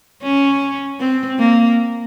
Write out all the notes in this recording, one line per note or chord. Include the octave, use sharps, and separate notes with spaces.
C#4
C4
A#3